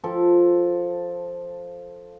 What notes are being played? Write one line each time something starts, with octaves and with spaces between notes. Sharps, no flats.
F3 A4